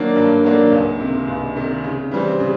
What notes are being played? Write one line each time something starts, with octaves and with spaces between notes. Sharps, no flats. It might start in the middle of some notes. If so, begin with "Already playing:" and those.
Already playing: D#3 F#3 A#3 D4
G2
D#3 F#3 A#3 D4
C#2
C3 D#3
C#2
C3 D#3
C#3
E3 G3 C4
C#3